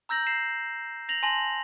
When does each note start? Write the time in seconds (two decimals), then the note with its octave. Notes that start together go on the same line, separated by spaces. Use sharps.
0.09 A#5 E6 G6 A#6 F#7
0.27 C7 E7
1.09 A#6 F7 F#7
1.23 G#5 A5 C6 A#6 F#7